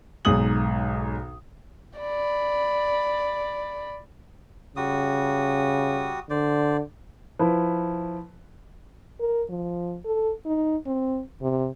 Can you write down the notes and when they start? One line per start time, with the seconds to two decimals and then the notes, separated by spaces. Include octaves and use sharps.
0.25 B1 G#2 G#4 D#6 F#7
2.00 D5 B5
4.77 C#3 G3 F#4 D#6
6.30 D3 C5 D5
7.39 F3 E4 B4
9.20 A#4
9.50 F3
10.05 A4
10.45 D#4
10.86 C4
11.41 C3